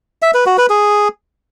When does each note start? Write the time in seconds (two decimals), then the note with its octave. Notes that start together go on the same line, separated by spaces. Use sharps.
0.22 E5
0.34 B4
0.46 F#4
0.58 B4
0.70 G#4